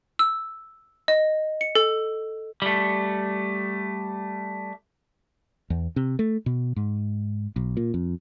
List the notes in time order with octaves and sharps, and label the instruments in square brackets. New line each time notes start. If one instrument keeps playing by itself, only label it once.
[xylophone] E6
D#5
C#7
A4
[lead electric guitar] G3 A3
[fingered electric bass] E2
C3
A3
B2
G#2
B1
A#2
F2